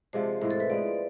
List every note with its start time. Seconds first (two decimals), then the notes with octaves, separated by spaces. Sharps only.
0.13 C3 F3 G#3 D4 C5
0.41 A2 E3 G#3 C5
0.51 A4
0.60 B4
0.69 F3 G#3 B3 D5